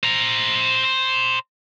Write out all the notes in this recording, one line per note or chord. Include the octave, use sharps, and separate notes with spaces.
C5 A#5